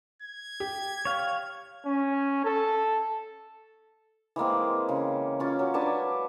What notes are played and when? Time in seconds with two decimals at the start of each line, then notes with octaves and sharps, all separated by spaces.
0.22 G#6
0.60 G4
1.05 C#5 F5
1.85 C#4
2.45 A4
4.36 E3 G#3 A#3 C4
4.89 C#3
5.40 C#4 F4 D6
5.59 F#3
5.74 D4 B4 G#5 A5